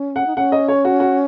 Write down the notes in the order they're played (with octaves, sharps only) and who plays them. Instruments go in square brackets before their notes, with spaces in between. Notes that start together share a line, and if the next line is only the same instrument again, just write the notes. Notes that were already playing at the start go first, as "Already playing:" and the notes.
Already playing: [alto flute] C#4
[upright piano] F#5
[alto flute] D#4
[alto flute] C#4 [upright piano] F#5
[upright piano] D#5
C#5
F#4
F#4